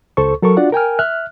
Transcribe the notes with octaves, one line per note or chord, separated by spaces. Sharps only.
C#2 A4 C5 C#6
F#3 A4 A#4 C#6
D4 F4 F#4 D5 F#5
A#4 G5 G#5 F6
E5 F6 F#6